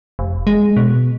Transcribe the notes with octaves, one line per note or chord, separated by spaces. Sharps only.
F1
G#3
B2